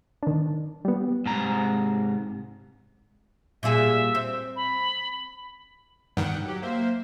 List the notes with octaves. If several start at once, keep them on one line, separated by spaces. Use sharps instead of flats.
D#3 D4
G3 B3
G#2 C3 A#5
A#2 G3 G#4 E5
C4
B5
G2 D#3 F#5 G5
F#3 G4
A#3 C5 E5